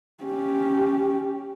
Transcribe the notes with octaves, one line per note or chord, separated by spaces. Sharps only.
C#4 G4